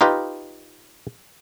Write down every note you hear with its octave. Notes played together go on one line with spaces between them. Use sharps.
D#4 F4 G4 B4 D#5